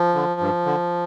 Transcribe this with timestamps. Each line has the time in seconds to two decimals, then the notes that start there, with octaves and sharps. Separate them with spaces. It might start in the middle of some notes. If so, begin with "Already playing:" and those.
Already playing: F3
0.15 D3
0.40 G2
0.66 D3